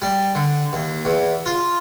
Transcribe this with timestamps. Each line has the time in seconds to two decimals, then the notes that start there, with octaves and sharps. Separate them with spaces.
0.02 G3
0.35 D3
0.73 D#2
1.05 E2
1.46 F4